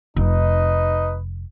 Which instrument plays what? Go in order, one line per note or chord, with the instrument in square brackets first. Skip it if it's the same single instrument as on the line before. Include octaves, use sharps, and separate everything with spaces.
[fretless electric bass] F1 [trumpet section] D#4 B4 D#5